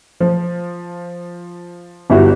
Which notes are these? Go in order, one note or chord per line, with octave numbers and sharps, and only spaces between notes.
F3
G1 E4 F#4 G4